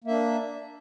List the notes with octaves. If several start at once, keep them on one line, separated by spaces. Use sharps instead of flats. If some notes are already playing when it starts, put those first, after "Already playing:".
A#3 D4 E5